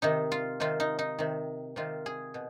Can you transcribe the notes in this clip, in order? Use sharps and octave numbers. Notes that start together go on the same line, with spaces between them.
C3 D#3 D#4
F4
C3 D#3 F4
D#4
D#4
C3 D#3
C3 D#3 F4
G#4
B2